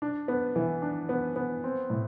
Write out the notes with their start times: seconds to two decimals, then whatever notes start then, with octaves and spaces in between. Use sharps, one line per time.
0.02 D4
0.28 B3
0.56 E3
0.82 D4
1.09 B3
1.36 B3
1.64 C4
1.90 A2